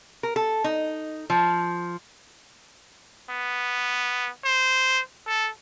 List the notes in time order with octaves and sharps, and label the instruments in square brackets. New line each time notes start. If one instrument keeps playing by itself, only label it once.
[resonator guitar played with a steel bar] A#4
A4
D#4
F3
[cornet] B3
C5
A4